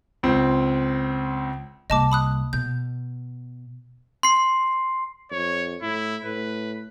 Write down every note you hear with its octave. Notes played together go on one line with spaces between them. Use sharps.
C#2 C4
C2 A#3 D#5 A5 D6
B5 D#6 F#6
B2 G6
C6 C7
F2 C#5
A2 E4
A2 B4